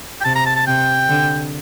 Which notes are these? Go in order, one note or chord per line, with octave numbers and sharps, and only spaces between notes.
G5
C3 A5
A#5
A5
A5
C3 G5
D3